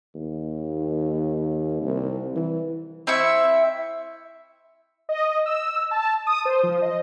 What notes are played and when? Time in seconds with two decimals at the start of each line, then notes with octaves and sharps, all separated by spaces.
0.15 D#2
1.82 C2
2.36 E3
3.07 C4 E4 E5 C#6
5.09 D#5
5.46 E6
5.91 A5
6.27 D#6
6.45 C5
6.63 F3
6.82 D#5